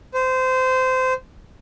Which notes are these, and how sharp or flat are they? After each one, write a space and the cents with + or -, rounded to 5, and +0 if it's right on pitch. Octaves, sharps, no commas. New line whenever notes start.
C5 -20